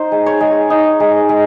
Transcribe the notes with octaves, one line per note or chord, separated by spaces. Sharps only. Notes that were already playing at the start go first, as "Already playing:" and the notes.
Already playing: D#4 C5
G#3
C#5
G#3
D#4
G#3
G#3